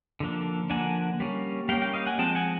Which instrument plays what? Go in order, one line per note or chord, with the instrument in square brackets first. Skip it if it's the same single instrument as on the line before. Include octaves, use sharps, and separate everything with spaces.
[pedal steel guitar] D3 F3 A#3 D4
D3 F3 A#3 D4 F#5 G#5
G3 A#3 C#4
G3 A#3 C#4 F5 G5
F5 G5
D#5 F5
F#5 G#5
F3 G#3 C4 G5 A5
F#5 G#5